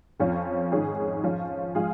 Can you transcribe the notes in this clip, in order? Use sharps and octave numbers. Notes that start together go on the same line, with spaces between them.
F2 F3 C#4 F4
G#2 D#3 C#4 G#4
F3 C#4 F4
F3 G#3 F4 G#4